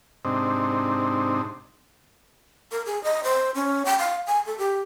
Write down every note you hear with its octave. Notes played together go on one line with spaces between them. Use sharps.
G#2 C3 C4 D4 D#4
A#4
G#4
D#5
C5
C#4
G5
F5
G#5
A4
G4